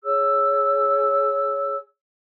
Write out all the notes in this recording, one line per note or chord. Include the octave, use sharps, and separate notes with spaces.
G#4 C#5 E6